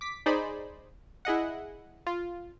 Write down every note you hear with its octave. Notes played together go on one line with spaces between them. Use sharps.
D6 B6
D#4 G#4 C5 D5 B5
E4 G#4 D#5 F#5
F4